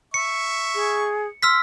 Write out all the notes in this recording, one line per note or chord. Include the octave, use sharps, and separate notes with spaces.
E5 C#6 C#7
G#4
C6 E6 F6 B6